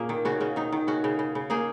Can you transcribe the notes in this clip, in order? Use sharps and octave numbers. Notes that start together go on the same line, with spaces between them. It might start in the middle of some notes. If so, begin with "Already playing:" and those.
Already playing: A#2 A#3 C#4 G#4
D#3
C#3 C#4 F#4
C#3 C#4
D#3 D#4
D#3
C#3 C#4 F#4
C#3
C#3
C#3
A#3 D#4 G#4